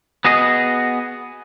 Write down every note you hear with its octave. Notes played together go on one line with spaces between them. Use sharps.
B3 F#4 G#4 D#5